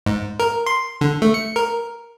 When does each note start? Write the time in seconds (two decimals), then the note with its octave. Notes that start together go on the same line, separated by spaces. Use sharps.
0.06 G#2
0.40 A#4
0.66 C6
1.01 D3
1.22 A3
1.34 C#7
1.56 A#4